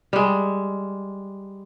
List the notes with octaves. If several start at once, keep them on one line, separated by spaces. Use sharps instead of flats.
G3 G#3